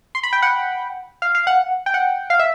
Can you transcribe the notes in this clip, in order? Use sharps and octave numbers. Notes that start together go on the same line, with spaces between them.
C6
B5
G5
F#5
F5
F5
F#5
G5
F#5
F5
E5